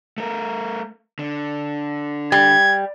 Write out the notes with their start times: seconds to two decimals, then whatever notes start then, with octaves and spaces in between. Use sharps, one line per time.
0.18 A3 A#4
1.19 D3
2.32 G3 G#6